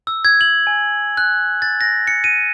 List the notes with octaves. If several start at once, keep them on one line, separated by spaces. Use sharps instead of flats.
E6
G#6
F#7
G#5
F#6
A6
A#6
C#7
D#7